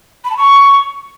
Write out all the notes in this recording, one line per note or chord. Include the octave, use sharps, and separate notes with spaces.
B5
A5
C#6